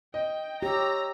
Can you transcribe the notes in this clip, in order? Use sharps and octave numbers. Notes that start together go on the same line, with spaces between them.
D#5 G5
G4 C#5 A#5 E6